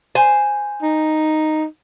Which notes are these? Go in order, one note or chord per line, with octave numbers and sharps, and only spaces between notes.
C5 G#5
D#4